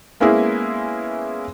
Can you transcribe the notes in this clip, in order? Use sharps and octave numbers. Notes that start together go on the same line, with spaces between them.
G#3 A#3 B3 C#4 E4 G#4